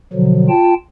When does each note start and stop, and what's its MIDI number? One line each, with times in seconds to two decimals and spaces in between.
0.13 0.48 47
0.13 0.48 50
0.13 0.48 53
0.13 0.48 54
0.49 0.74 65
0.49 0.74 79
0.49 0.74 81